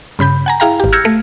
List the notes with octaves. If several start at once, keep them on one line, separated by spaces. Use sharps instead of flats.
G2 C#3 B5 G6
F#5 G#5 A#5
E4 G#4 F5 G5 A#5
G#1 G4
E6 F6 G6 G#6 A#6 C#7
A3